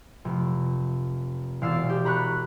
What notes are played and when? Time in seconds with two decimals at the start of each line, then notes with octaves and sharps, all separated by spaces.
0.25 F1
1.61 E1 D5 F5 E6 A6
1.90 G4
2.05 A#5 B5 C#6 F#6